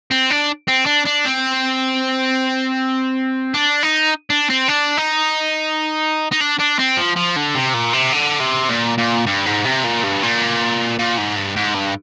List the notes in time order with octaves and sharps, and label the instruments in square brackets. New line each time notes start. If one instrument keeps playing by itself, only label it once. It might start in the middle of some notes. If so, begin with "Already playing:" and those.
[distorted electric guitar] C4
D4
C4
D4
D4
C4
D4
D#4
D4
C4
D4
D#4
D#4
D4
D4
C4
F3
F3
D3
C3
A#2
C3
D3
C3
A#2
A#2
G2
G#2
C3
A#2
G2
A#2
A#2
G#2
G2
G#2
G2